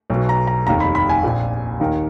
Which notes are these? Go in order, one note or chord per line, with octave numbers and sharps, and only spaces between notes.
B1 B2
A#5
A#5
F1 D#2 D#3 A#5
B5
B5
G#5
A#1 A#2 F3
D#2 D#3